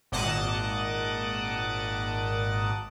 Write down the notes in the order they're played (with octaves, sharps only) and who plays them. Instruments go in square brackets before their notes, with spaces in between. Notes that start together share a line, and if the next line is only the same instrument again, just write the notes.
[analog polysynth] G#1 A#2 D#5 F#5 A5 D6